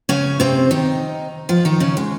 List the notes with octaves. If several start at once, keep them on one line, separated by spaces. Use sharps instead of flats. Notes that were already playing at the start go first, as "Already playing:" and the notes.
C#3 C#4
C3 C4
D#3 D#4
F3 F4
D#3 D#4
C#3 C#4
G#3